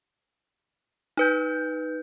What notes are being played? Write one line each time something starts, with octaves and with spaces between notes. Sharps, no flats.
D#4 B4 G6